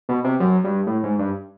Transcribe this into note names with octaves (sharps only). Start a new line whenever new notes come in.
B2
C3
F#2
G2
A2
G#2
G2